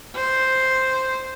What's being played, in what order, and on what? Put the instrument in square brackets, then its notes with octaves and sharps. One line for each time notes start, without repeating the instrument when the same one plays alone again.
[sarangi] C5